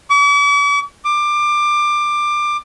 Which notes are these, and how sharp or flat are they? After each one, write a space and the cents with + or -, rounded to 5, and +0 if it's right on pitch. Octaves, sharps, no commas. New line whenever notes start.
D6 -45
D6 +20